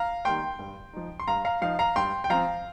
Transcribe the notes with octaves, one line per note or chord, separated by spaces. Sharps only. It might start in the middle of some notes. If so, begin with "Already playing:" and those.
Already playing: F5 A#5
D#3 G3 A#3 G5 C6
G2
F3 D#4
C6
G2 F5 A#5
F5 A#5
F3 D#4 F5
F5 A#5
G2 G5 C6
G5
F3 C4 F5 A#5